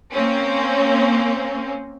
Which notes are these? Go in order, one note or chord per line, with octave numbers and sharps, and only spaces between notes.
A#3 C4 C#4